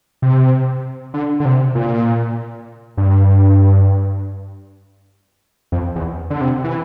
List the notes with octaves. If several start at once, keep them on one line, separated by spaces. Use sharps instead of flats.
C3
D3
D3
C3
A#2
G2
F2
E2
D3
C3
E3